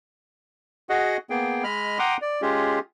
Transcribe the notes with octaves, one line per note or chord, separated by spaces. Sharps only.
F#4 G#4 D#5 F#5
A#3 B3 G#4 G5
G#3 D#5 B5 F6
F#5 G5 A#5 C6 D6 D#6
D5
G#3 C#4 F4 G4 G#4